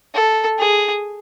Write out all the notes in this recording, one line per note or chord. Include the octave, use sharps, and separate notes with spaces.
A4
G#4